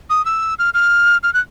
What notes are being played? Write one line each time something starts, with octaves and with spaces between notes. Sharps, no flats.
D#6
E6
F6
F6
F6
F#6